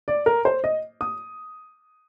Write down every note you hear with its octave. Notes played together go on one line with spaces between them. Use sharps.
D5
A#4
C5
D#5
D#6